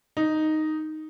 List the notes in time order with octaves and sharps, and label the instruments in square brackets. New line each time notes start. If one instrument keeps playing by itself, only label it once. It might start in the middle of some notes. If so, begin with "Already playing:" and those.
[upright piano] D#4